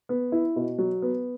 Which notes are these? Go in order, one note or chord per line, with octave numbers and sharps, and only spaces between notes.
B3
E4
B2
F#3
B3